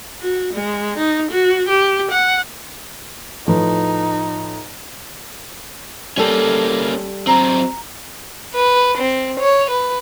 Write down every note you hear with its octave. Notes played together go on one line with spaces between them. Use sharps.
F#4
G#3
D#4
F#4
G4
F#5
A2 F3 D#4 B4
G3 A#3 C#4 A4
F#3 C4 A#5
B4
C4
C#5
B4